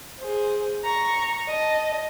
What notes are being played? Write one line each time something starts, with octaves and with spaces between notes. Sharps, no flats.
G#4 C5
A#5 C#6
D#5 A5